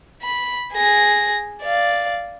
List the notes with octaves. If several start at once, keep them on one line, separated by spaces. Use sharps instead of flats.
B5
G#4 A#6
D5 F5